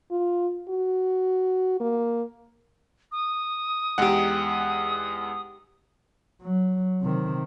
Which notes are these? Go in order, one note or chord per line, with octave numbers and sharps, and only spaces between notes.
F4
F#4
A#3
D#6
E2 G#3 D#4 G4 F#5
F#3
C3 D#3